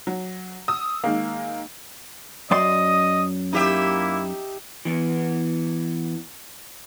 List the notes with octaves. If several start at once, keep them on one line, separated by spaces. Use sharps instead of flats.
F#3
D#6 E6
D#3 G#3 A#3
F#2 D5 D#5 C6 D#6
A#3 D#4 E4 G4 E5
E3 B3